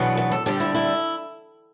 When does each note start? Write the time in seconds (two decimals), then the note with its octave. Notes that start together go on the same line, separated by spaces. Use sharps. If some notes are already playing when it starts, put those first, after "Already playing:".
Already playing: E2 B2 F#3 B3 D4
0.17 B4
0.32 A4
0.46 D3 G3 D4 G4
0.60 E4
0.75 E4